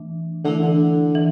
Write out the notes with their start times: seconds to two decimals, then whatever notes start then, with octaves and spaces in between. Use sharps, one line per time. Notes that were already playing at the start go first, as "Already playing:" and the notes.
Already playing: E3 A3 D4
0.44 D3 E3 A3 E4
0.62 D3
1.15 E3